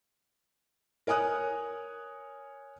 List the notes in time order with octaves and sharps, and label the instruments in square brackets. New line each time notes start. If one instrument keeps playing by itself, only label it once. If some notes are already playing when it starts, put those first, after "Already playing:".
[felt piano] A#4 C#5 G#5 D#6 F#6